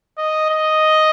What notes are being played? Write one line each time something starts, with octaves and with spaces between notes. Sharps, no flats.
D#5
D#5